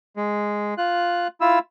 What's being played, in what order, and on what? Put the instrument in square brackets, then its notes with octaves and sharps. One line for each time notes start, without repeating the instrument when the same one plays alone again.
[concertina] G#3
F4 F#6
E4 F4 E6